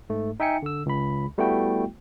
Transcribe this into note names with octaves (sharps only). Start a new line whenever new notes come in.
G#2 A3
D#4 E5 G5 G#5 C#7
D3 E6
C#2 B5
G3 A3 B3 E4 F#4 G5